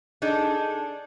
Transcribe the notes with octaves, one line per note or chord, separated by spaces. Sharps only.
D4 D#4 G#4 A4